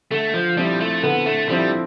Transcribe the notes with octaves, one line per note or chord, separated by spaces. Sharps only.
D3 A3
F3
F3 G3 C4 E4
A3
D3 B3
A3
F3 G3 C4 E4